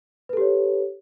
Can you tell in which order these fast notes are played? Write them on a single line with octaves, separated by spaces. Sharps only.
B4 A4 G4 C#5